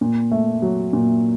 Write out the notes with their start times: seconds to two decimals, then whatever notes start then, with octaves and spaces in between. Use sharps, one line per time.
0.01 A#2
0.31 A3
0.62 F#3
0.93 A#2